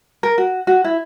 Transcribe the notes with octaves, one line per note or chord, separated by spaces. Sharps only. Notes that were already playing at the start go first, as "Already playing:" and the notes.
A#4
F#4
F#4
E4